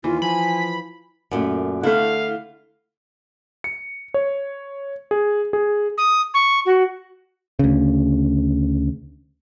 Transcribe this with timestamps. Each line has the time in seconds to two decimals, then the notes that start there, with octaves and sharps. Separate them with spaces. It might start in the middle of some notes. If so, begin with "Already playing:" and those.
0.04 D#2 E3 F4
0.22 F3 G#5 B5
1.31 F#2 A#2 A3
1.83 D3 A3 E4 F5
3.64 C#7
4.14 C#5
5.11 G#4
5.53 G#4
5.98 D#6
6.34 C#6
6.66 F#4
7.59 D2 C#3